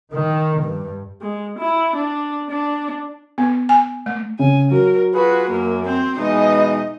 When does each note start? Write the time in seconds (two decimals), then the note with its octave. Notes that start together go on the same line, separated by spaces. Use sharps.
0.14 D#3
0.62 G2
1.21 G#3
1.59 E4
1.96 D4
2.50 D4
3.38 B3
3.69 G#5
4.06 A3
4.39 C#3 G#5
4.71 F#3 A#4
5.14 F4 F#4 G#4 B4
5.50 F#2 A#3
5.85 C4 C5
6.18 B2 E3 G#3 D#4 D#5